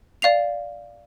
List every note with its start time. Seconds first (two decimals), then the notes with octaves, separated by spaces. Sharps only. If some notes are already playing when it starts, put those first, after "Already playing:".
0.22 D5 F5 C7 F7